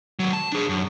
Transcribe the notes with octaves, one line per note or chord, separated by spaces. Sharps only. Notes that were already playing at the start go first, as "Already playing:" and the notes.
D#2 F#3
A5
D4 G#4
F#2